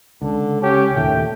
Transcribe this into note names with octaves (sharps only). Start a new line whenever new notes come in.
C#2 D3
C#4 G4
D#2 A#2 D#3 A3 G5